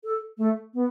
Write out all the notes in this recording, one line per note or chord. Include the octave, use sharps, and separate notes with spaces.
A4
A3
B3